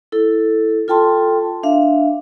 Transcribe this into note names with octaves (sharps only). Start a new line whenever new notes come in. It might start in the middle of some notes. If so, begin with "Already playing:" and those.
E4 A4
F4 A4 G5 A5 C6
D4 E5 F5